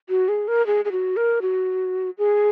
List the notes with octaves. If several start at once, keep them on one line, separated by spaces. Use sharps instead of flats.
F#4
G#4
A#4
G#4
G#4
F#4
A#4
F#4
G#4